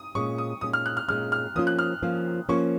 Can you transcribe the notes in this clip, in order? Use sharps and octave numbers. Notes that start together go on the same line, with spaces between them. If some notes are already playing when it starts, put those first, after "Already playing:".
Already playing: D#6
A#2 G#3 C#4 C#6
D#6
A#2 G#3 C#4 D#6
F6
F#6
F6
A#2 G#3 C#4 F6
F6
F3 A#3 C#4 F4 D#6
F#6
F6
F3 A#3 C#4 F4
F3 A#3 C#4 F4 C#6